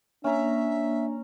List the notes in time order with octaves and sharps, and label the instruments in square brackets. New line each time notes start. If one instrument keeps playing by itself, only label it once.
[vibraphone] A#3 [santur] C#4 A#5 [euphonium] D4 [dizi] E5